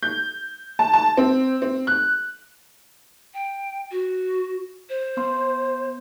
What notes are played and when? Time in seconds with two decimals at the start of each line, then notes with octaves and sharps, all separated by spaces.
0.03 G6
0.79 A5
0.94 A5
1.17 C4
1.62 C4
1.87 F#6
3.34 G5
3.91 F#4
4.89 C5
5.17 B3 C6